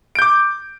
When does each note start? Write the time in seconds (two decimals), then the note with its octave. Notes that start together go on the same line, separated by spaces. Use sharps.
0.15 D7
0.19 G6
0.22 D6